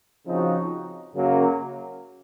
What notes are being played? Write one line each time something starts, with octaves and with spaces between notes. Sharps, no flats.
C#3 F3 C4 D#4 F#4
F#2 C#3 F#3 A#3